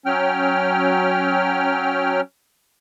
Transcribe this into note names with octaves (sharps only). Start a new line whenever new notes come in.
F#3 C#4 G5 F6